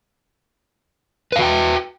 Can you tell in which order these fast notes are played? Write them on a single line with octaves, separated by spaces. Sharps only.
B4 F5 F#4 G5